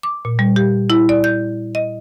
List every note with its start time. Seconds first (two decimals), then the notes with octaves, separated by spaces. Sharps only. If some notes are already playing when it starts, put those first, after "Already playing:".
0.03 D6
0.25 A#2
0.39 G3
0.56 G4
0.90 E4
1.09 D5
1.24 G6
1.75 D#5